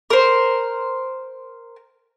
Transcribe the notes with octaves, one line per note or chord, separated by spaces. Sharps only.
A#4 C5